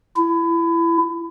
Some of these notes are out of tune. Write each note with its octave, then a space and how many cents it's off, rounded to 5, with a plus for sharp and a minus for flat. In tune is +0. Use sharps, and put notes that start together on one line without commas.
E4 +25